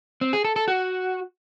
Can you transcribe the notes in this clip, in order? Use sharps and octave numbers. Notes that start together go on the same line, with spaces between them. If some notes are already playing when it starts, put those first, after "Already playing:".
C4
G#4
A4
A4
F#4